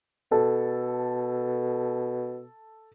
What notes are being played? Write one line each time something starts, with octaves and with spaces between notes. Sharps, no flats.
B2 A4